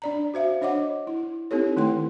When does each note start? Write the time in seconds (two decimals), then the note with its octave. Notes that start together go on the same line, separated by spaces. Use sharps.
0.02 D4 D5 A#5
0.34 F#4 C5 E5 F5
0.61 D4 C#5 D#5 F#5 D6
1.07 E4
1.51 C4 D#4 E4 G4 A4 C#5
1.76 D#3 A3 E4 B4 G5 C6